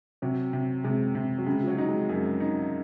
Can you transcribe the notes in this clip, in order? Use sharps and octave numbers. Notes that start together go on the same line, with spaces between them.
C3 F#3
C3
C3 G#3
C3
F#3
C#3 G#3
F3
F#3
D#4
G#3
F#2 G#3
D#4